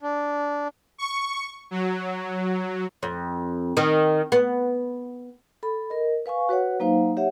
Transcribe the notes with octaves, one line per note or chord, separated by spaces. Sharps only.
D4
C#6
F#3
F2
D#3
B3
A4 B5
A#4 D#5
B4 F5 G#5 C#6
F#4 B4 C#5 F#5
F#3 A#3 D#4 C5 F5
G4 C#5 E5 F#5